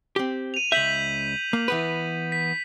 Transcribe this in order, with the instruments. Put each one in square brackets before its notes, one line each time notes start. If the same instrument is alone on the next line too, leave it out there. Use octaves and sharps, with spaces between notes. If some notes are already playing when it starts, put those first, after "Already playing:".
[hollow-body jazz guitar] C4 G4
[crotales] D#7 F7
[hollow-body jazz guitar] C#2 E5 [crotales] G6 B6 F#7
[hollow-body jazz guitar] A#3
E3 B3 B4
[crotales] B6